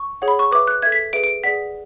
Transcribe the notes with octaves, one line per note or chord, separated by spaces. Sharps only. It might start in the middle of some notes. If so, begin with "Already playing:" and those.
Already playing: C#6
G#4 C#5 F#5
B5
C#6
B4 E5 D6
F#6
A4 E5 G#6
B6
G#4 B4 E5 D7
D7
G#4 D5 F#5 B6